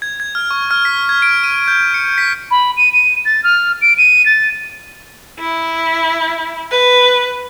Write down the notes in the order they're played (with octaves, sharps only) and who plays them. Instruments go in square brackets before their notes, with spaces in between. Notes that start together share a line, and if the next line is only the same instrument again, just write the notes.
[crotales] G#6
G#6
F6
C#6
F6
B6
G#6
D7
D#7
G6
C#7
B6
[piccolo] B5
D#7
D#7
A6
F6
D7
D#7
A6
[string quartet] E4
B4